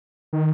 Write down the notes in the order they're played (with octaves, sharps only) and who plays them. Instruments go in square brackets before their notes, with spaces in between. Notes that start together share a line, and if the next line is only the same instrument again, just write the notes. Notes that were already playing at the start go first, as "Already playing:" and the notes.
[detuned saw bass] D#3